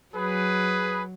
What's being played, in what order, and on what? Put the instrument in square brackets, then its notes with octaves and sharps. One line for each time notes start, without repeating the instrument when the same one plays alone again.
[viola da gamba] F#3 [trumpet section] G#4 B4